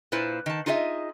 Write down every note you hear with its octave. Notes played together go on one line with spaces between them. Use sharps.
A#2 A#3 E4 B4 C5
D#3 A5
D#4 F4 G#4 C5 D#5 E5